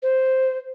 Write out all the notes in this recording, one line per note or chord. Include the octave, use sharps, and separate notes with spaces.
C5